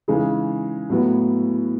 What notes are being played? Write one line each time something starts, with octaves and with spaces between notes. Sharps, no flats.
C#3 E3 G#3 D#4 G#4
A2 F#3 B3